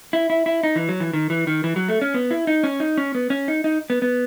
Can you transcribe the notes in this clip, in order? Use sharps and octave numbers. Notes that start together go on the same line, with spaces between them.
E4
E4
E4
D#4
E3
F#3
E3
D#3
E3
D#3
E3
F#3
A3
C#4
B3
E4
D#4
C#4
D#4
C#4
B3
C#4
D#4
D#4
B3
B3